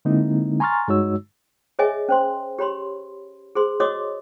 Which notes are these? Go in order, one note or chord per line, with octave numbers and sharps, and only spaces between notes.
D3 G#3 A#3 C4 D#4 E4
G#5 A#5 C6 C#6 F6 A6
G2 G#3 D#4 F#4 C#5 E6
G#4 C#5 D#5 E5 G#5
C#4 C5 C6
G4 C#5 B5 C6
G#4 C5 C6
F#4 C#5 D#5 C6 D6 D#6